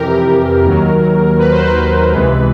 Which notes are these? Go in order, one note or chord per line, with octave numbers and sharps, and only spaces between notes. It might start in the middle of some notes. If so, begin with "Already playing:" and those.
Already playing: F2 C3 E3 G4 A#4
D#2 D#3 F#3
B4
C5
B4
C#2 C3 E3 G#3